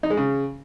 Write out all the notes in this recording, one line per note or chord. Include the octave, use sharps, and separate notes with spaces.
D#4
G#3
C#3